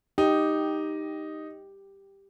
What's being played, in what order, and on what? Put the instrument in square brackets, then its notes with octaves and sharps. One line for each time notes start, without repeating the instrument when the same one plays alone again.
[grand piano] D#4 [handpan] G4